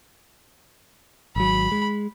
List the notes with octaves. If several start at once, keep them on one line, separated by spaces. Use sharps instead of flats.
G#1 F#3 B5
G#3